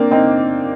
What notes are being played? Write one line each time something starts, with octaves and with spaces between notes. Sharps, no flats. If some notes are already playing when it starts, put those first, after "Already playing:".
Already playing: A#3 C4 D4
C4 D#4